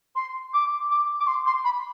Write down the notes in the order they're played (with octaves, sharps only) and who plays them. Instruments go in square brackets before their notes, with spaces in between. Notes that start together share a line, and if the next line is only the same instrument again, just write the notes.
[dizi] C6
D6
D6
D6
C6
C6
B5